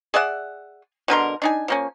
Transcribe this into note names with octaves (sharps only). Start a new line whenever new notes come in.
G#4 D5 E5 F#5
B2 D3 A#4 C6
D4 D#4 G#5
F3 A#3 C#4